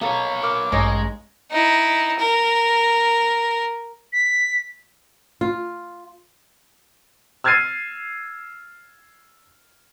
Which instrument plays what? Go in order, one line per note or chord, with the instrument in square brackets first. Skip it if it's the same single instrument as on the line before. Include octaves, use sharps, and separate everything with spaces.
[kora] A#3 A4 [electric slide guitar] B3 C#5
[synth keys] A#4 F6 [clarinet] D6
[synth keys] A1 G2 A#6 [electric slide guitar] G#3 [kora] C#4 D#4 C#5
[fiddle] D#4 E4
A#4
[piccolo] B6
[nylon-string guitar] F4
[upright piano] E6 F6 G#6 A6 C7 D#7